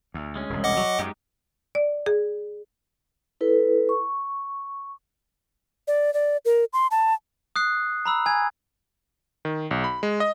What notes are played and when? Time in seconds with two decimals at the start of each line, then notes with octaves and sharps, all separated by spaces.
0.14 D2
0.36 G#3 C#4
0.50 E1 C2
0.64 D#5 F#5 D6
0.77 F#3
0.99 F#2 G#3 D#4 G4
1.75 D5
2.06 G#4
3.41 E4 A4 B4
3.89 C#6
5.88 D5
6.14 D5
6.45 A#4
6.73 C6
6.91 A5
7.56 D#6 F#6 C7
8.05 A#5 B5 E6
8.26 G#5 G#6
9.45 D#3
9.71 B1
9.84 B5
10.03 G#3
10.20 D#5